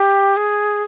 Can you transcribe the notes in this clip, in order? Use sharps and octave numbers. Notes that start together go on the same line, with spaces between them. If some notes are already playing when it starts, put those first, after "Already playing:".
Already playing: G4
G#4